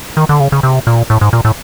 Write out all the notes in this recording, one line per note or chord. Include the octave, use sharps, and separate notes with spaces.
D#3
D3
C#3
C#3
C3
A#2
A2
G#2
A#2
A2